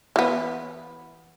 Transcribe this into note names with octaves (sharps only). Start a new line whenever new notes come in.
E3 B3